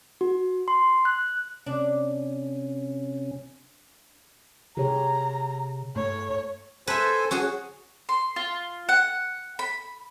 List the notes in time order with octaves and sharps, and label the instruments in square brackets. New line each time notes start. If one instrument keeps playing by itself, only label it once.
[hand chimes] F#4
C6
F#6
[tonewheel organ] C3 C#4 [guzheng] D4
[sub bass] C3 [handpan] G4 G#4 C#5 [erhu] A#5
[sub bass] G2 [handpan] A3 [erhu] C#5
[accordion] A4 C5 G#5 [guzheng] B4 E5
[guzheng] C#4 F#4 G#4
[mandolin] C6
F4
F#5
B5